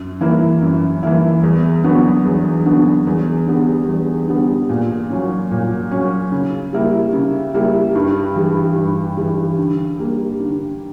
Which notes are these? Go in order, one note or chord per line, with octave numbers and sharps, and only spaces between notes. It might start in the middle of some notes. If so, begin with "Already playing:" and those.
Already playing: F#2
E3 A#3 E4
F#2
E3 A#3 E4
E2
D3 F#3 B3 D4
E2
D3 F#3 B3 D4
E2
D3 G3 B3
E2
D3 G3 B3
A#2
F#3 C#4
A#2
F#3 C#4
C#3
G3 A#3 E4
C#3
G3 A#3 E4
G2
E3 G3
G2
E3 G3
D3
G3 A#3
D3